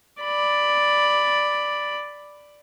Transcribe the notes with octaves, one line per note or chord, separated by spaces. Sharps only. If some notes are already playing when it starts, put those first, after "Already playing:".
D5 B5